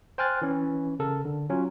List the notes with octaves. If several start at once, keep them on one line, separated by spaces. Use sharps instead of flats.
C5 G5 G#5 F6 F#6 A6
E3 C#4
C#3 A4 A#4
D3
F#3 C#4 F4